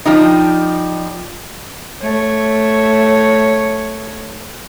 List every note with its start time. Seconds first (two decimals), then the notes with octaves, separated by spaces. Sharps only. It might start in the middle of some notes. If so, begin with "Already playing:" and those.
0.06 F3 G3 D#4
2.01 A3 C#5